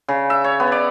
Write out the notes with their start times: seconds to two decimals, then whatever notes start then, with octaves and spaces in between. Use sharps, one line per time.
0.08 C#3
0.30 E5
0.44 C#5
0.60 B3
0.72 D5